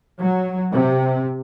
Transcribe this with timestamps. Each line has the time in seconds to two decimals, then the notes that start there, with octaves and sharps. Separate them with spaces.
0.19 F#3
0.71 C3